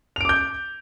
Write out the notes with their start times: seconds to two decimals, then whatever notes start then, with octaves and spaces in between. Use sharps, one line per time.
0.16 F7
0.21 D7
0.25 D6
0.29 G6